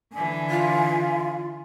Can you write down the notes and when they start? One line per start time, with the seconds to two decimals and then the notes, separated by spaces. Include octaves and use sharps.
0.13 D3 E3 G#5
0.49 F4